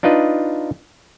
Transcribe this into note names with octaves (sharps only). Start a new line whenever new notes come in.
D4 D#4 F4 B4 D#5